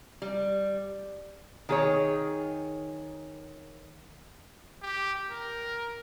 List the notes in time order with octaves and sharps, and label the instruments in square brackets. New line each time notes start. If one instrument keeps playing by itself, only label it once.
[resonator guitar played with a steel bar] G3
D#3 G#4 C#5
[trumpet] G4
A#4